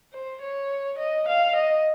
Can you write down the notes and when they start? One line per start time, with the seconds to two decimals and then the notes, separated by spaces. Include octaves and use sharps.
0.13 C5
0.41 C#5
0.98 D#5
1.28 F5
1.56 D#5